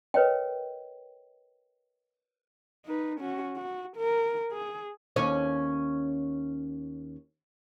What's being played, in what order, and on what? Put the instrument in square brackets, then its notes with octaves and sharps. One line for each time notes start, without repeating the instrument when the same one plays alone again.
[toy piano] A#4 B4 C#5 D#5 G5
[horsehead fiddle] D#4 B4
C#4 F#4
F#4
A#4
G#4
[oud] D#2 C#4 C#5